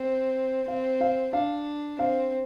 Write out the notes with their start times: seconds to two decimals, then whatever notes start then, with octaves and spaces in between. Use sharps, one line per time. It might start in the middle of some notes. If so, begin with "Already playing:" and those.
Already playing: C4
0.68 C4 F5
1.01 F5
1.33 D4 F5
1.99 C4 F5